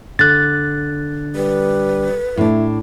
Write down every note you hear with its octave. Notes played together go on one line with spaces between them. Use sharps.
D3 F#6 A6
G3 B4
A2 D4 E4